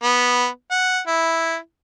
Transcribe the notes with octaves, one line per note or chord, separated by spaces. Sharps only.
B3
F#5
E4